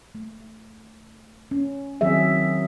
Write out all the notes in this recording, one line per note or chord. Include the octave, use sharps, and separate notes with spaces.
A3
C#4
D#3 F#3 C4 G#4 E5